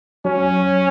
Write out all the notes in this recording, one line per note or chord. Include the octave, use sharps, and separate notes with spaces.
F#3 C#4